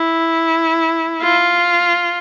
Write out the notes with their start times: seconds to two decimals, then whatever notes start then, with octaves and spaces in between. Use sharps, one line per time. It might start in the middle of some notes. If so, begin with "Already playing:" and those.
Already playing: E4
1.22 F4